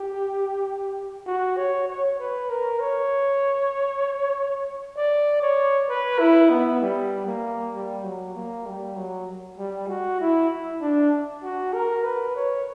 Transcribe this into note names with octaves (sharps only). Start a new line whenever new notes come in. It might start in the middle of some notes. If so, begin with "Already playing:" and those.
Already playing: G4
F#4
C#5
C#5
B4
A#4
C#5
D5
C#5
B4
E4
B3
G3
A#3
G3
F#3
A#3
G3
F#3
G3
F#4
E4
D4
F#4
A#4
B4
C#5